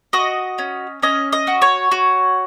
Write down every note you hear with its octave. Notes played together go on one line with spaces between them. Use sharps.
F#4 D#5
C#4
C#4 D#5
D#5
F#4
C#5
F#4